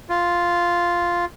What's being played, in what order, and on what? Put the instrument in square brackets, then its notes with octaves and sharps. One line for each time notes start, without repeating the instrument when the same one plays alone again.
[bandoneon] F4